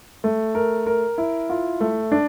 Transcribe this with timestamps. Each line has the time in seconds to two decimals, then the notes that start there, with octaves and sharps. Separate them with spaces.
0.24 A3
0.55 A#4
0.87 A#4
1.18 E4
1.50 F4
1.81 A3
2.12 D4